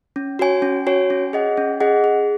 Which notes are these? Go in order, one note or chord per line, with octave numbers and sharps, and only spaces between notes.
C#4
F#4 C#5 G#5
C#4
F#4 C#5 G#5
C#4
G#4 D#5 F#5
C#4
G#4 D#5 F#5
G#4